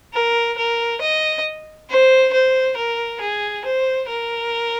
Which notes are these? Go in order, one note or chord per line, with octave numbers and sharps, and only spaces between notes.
A#4
A#4
D#5
C5
C5
A#4
G#4
C5
A#4